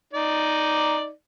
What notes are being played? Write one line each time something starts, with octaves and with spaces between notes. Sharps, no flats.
D#4 D5